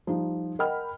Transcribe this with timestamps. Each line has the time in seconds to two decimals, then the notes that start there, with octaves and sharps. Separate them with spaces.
0.07 F3 G3 D#4
0.59 A#4 D#5 F#5 G5 B5 F6